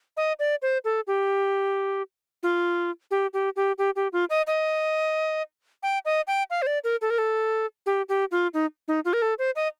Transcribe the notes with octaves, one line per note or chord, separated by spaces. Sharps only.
D#5
D5
C5
A4
G4
F4
G4
G4
G4
G4
G4
F4
D#5
D#5
G5
D#5
G5
F5
C5
D5
A#4
A4
A#4
A4
G4
G4
F4
D#4
D#4
F4
A#4
A4
C5
D#5